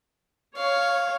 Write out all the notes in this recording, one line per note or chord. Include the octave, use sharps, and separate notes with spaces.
C#5 F5